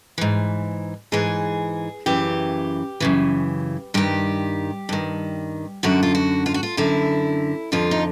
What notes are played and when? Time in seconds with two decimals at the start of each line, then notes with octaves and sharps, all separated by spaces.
0.18 G#2 E3
1.12 G#2 E3 G#4
2.06 F#2 C#3 E3 G4
3.00 F#2 C#3 E3
3.94 G2 D#3 G4
4.89 G2 D#3
5.83 F#2 D3 F#4
6.03 F4
6.15 F#4
6.46 F4
6.54 F#4
6.63 F4
6.77 F#2 D3 E4
7.72 F2 D3 F4
7.91 D#4